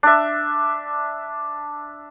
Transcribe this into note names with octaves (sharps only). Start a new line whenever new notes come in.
D4 E5